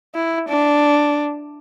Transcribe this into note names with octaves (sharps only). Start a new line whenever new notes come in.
E4
D4